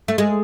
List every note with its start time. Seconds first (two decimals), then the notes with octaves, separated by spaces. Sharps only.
0.08 A3
0.18 G#3